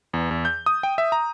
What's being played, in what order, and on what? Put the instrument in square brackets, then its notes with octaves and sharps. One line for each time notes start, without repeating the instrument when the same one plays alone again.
[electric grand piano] E2
E2
G6
D#6
G5
E5
A#5